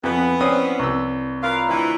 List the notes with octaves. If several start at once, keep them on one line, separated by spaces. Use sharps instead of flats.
F2 E3 B3
C4 C#4 C#5 D5 E5 D#6
C2 E6
F4 A#4 B4 E5 F5 A#5
D2 B2 E3 C5